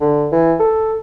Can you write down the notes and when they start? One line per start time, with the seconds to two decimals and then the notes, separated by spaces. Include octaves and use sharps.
0.01 D3
0.32 E3
0.60 A4